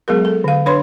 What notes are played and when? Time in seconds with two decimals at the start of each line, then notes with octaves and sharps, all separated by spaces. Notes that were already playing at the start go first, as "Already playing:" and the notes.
0.08 F#3 G#3 B3 G#4 A#4
0.25 A4
0.44 D3 F5
0.66 D4 B4 C#5 B5 C6